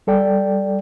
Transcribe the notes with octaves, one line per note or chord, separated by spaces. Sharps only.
G3 A4 D5 G5